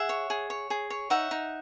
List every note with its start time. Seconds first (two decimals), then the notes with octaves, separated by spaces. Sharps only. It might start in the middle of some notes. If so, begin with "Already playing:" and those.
Already playing: G#4 E5 F#5
0.09 C#5
0.30 G#4
0.50 C#5
0.70 G#4
0.90 C#5
1.10 D#4 E5 F#5
1.31 D#4